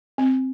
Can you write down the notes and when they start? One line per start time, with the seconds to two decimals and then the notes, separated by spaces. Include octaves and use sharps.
0.18 C4